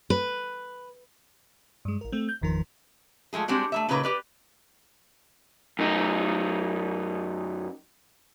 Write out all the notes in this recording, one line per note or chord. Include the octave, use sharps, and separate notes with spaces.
B4
G2 G#3
A1 A#4
A3 C4
G6
G1 E2 D#3 F3 A#4
F3 G#3 A3 G#4
G3 G#3 C4 D4 F#4
A3 A#3 E5
A#2 C#3 A#3 D#4 B4 A#5
G4 B4 D5
F#2 D#4